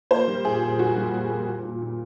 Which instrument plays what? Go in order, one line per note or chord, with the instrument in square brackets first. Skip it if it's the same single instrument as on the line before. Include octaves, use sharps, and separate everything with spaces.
[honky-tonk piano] A#3 C5
G3
A#2 G#4
A#2
G3 F#4
G3
A#2
A#3
A#2
A#2
A#2